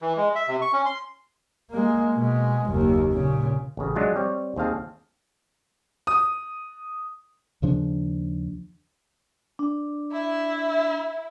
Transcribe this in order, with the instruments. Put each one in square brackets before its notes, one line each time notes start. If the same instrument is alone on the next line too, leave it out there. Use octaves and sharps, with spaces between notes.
[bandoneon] E3
G#3
E5
C3
C#6
C#4
C6
[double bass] G#3 A#3
B2 G#3
F#1 D#2
A#2 C#3
[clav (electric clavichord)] A1 C#3
F#3 G#3 D4 F4
G3 C4 C#5
D#2 C4 G#4 F5 A5
[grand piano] D#6
[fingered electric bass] D#2 C#3 F3 D4
[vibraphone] D4
[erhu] E4